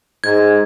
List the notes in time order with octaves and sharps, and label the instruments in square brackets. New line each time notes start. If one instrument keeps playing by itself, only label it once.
[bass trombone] G#2 [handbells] G#6